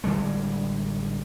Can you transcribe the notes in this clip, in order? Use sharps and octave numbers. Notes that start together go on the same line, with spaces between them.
A1 D3 G3 G#3